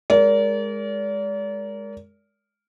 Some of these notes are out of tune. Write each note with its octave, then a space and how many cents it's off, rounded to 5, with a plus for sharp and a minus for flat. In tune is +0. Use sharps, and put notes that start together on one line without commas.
G#3 +0 A#4 +0 D5 -40